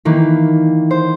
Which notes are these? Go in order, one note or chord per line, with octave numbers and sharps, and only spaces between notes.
D#3 E3 A#3
C5